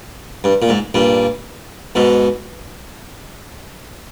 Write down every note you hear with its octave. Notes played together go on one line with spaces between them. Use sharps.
G2
A#2
G#2
G2 A#2
G#2 B2